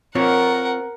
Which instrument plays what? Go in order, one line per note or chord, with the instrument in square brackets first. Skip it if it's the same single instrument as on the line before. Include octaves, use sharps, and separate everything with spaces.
[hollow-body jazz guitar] C4 F4 C#5 [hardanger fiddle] A#4 F#5